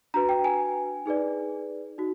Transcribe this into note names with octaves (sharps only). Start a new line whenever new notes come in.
D4 F#4 B4 A#5
G5
G#5
D#4 G#4 B4 D5
D#4 F#4